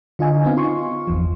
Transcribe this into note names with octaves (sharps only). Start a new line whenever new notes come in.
D3 F4 D#5 G#5
B3 C4 D#4 F5
F4 C6 C#6
G1 E2 F3